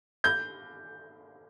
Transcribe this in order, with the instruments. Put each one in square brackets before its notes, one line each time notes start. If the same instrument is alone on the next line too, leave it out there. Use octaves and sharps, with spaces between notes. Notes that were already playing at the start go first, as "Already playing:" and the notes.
[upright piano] G6